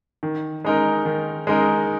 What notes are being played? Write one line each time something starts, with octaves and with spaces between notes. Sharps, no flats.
D#3
G#3 D#4 A#4
D#3
G#3 D#4 A#4